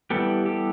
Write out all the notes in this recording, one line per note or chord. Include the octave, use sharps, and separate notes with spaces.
E3 G3 B3 G4 A4
G4 A4